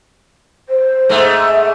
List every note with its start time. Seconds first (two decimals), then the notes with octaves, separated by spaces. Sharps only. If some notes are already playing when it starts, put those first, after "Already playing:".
0.69 C5
1.09 G#2 A3
1.47 E5